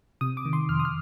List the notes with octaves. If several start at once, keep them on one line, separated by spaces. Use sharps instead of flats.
C3 D#6
D6
D#3
C6
F2 F6
D#6
F6